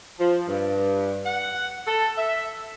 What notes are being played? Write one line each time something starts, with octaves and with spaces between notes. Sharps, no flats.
F3
G2
F#5
A4
E5